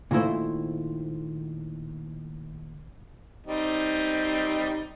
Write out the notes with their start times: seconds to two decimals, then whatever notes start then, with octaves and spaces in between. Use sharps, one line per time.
0.11 A#2 D#3 A3 E4 C5
3.47 G3 C4 D#4